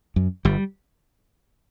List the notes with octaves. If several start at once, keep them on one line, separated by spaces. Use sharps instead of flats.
F#2
G1 G3